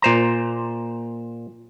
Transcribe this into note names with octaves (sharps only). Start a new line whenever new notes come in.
A#2 C5 A#5